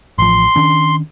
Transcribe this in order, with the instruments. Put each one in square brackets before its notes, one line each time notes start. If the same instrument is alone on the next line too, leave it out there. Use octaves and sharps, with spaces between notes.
[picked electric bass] A1 F3 [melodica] C6
[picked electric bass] D#3 C#4 D4